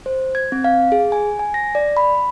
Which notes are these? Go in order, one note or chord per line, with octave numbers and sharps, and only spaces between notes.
C5
G#6
C4
F5
G#4
G#5
G#5
A#6
D5
B5